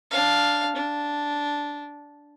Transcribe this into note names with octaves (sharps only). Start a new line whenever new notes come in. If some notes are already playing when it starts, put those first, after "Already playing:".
D4 F5
D4